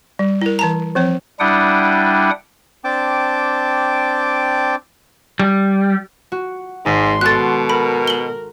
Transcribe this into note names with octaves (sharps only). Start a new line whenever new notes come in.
G3
E4 A#4
E3 A5 A#5
F3 C4 C#5
G3 D4 E4 F#5 G5 D#6
C4 D4 G5 A5 D6
G3
F#4
G#1 G#2 C6
B2 F#4 A4 F#6 A6
A#4 B5
F#7 G7